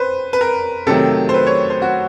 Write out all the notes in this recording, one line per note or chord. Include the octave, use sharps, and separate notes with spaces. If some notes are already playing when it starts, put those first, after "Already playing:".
Already playing: B4 C5
B4
A#4
C3 D#3 F#3 A3 A4
C5
B4
C#5
C5
F#4